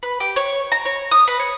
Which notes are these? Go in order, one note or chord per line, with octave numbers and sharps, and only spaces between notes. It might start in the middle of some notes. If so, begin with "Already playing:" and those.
B4
G4
C#5
A#5
C#5
D#6
B4
C#5